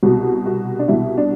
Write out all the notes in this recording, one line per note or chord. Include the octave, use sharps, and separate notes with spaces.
C2 B2 F#4
F#4
D4
C2 B2 E4
D4